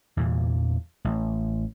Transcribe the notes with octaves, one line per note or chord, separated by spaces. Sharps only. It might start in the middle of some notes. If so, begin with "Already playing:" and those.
E2 A#2 E3
A1